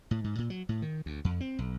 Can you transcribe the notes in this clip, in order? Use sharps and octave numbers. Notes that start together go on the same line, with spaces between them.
A2
G#2
A#2
F#3
A2
D#3
D2
F2
C4
B1